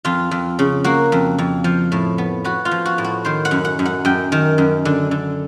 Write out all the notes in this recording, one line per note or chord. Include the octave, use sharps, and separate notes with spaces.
F2 F4
F2
C#3
A#3 F#4
F2
F2
F3
A2
B3
B3 F#4
F4
F3
F#4
A2
F#4
D#3 C5
F#5
F#2
F#5
F#2
F#5
F#2 G5
D#3
F#2
D3
D3